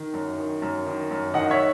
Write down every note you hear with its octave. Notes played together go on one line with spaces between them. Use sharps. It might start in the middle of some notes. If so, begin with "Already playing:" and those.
Already playing: D#3
F#2
D#3
F#2
D#3
F#2
D#3 D#5 F#5
C#5 E5